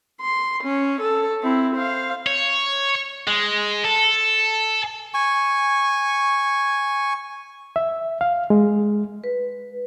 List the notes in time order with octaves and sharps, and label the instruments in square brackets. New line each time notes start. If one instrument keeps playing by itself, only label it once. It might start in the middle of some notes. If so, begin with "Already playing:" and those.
[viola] C6
C#4
A4
C4 E4
C5 F5
[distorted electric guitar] C#5
G#3
A4
[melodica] G#5 C#6
[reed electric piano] E5
F5
G#3
[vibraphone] B4